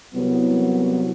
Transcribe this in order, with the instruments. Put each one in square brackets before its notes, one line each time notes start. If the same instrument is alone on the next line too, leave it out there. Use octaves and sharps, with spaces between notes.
[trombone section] C2 F#3 [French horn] B3